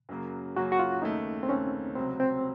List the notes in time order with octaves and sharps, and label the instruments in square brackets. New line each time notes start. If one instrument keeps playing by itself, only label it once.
[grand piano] F#2 C#3 F#3 A#3
[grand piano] F#2 C#3 F#3 A#3 [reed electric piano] F#4
[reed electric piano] F#4
F4
[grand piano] D#2 C#3 A3 [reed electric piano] D#4
[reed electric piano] C4
[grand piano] D#2 C#3 A3 [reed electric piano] C#4
[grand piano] C#2 C3 F#3 [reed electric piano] C4
[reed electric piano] C4